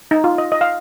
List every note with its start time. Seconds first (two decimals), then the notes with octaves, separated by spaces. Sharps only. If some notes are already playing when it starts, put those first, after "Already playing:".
0.11 D#4
0.24 F4
0.38 D#5
0.52 D#5
0.61 F5